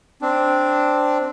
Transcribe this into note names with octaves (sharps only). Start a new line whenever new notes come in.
C4 D4